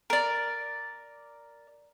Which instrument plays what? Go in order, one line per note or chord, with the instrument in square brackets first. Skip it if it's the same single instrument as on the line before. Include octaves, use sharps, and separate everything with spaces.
[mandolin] A#4 D5